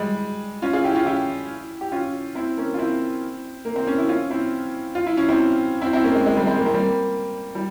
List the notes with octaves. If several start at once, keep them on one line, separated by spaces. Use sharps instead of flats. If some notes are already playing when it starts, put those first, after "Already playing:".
Already playing: G3 G#3
C#4 F4
F4 G#4
E4 G4
C#4 F4
E4 G4
G4
C#4 F4
C4 E4
A#3 C#4
F4
C4 E4
A#3
C4
C#4
E4
C#4 F4
C4 E4
F4
E4
C#4
C4 E4
C4 E4
C4 E4
A#3 C#4
G#3
G#3
G3 A#3
G#3 C4
A#3
C4
G3 A#3
G3